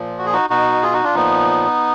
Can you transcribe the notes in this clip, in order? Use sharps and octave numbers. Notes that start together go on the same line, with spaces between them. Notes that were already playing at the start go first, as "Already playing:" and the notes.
Already playing: A#2 F3
F#4
G#4
D#4 F#4
B2 D#4 F#4
F4 G#4
D#4 F#4
D4 F4
A#2 F3 B3 D#4